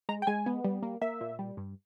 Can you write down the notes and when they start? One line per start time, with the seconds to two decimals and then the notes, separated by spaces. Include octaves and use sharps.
0.09 G#3 A#5
0.22 G5
0.27 G#3 G#5
0.46 B3
0.64 G3
0.83 A#3
1.02 A#3 E5
1.21 A#2
1.39 G3
1.57 G2